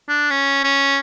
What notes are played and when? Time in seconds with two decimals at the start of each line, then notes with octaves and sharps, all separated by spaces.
0.09 D4
0.31 C#4
0.64 C#4